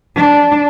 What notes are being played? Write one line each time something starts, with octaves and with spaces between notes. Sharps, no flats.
D4